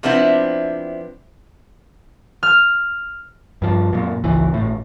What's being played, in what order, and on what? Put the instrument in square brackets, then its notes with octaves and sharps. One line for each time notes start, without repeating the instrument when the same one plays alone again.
[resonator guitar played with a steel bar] C3 F3 B3 C4 D4 E4
[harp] F6
[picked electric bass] G2 F3
F#2 A#2
G#1 C#2 E3
G#1 A2